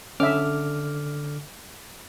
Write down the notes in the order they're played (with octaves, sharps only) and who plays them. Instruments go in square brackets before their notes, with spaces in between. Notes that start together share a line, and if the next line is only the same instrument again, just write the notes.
[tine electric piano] D3 D6 F6 [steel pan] C#4 E5